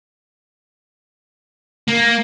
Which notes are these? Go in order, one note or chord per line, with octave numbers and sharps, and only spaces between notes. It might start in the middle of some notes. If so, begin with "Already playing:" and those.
A#3